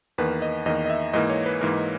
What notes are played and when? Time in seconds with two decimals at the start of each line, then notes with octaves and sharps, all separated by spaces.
0.18 E2 D#3 A#3 B4
0.42 D#5
0.66 E2 D#3 A#3 D#5
0.85 D#5
0.90 E5
1.13 G#2 E3 A#3 D#5
1.30 C#5
1.46 B4
1.61 G#2 E3 A#3 A#4